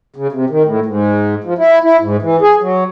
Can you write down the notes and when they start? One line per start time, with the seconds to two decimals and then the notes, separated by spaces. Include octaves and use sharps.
0.16 C#3
0.32 C3
0.50 D#3
0.65 A2
0.86 G#2
1.44 F3
1.58 E4
1.83 E4
2.01 G#2
2.22 E3
2.42 G#4
2.61 F#3